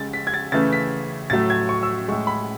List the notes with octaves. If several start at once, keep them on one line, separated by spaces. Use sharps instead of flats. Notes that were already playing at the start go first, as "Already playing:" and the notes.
Already playing: C#3 G#3 A6
B6
G#6
A6
C#3 E3 A3 A6
B6
A2 F#3 A3 A6
G#6
C#6
E6
A2 G#3 C#6
B5